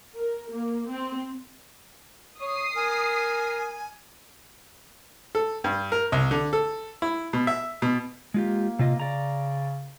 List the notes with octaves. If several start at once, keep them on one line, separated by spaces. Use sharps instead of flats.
A#4
A#3
C4
C#5 D#6 C7
A#4 G#5
A4
G2
A#4
C2
D3
A4
E4
B2
E5
B2
G#3 A#3 F4 G4
C3 F4 D#5
C#3 D5 A#5